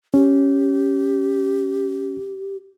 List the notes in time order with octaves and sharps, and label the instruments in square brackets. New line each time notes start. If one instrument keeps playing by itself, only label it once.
[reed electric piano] C#4 [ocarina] G4